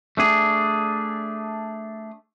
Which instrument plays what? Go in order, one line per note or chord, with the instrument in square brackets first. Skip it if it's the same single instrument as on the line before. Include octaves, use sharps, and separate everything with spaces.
[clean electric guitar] A3 D4 G#4